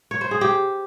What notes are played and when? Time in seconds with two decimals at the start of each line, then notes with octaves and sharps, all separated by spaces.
0.11 C#5
0.21 C5
0.31 G#4
0.41 G4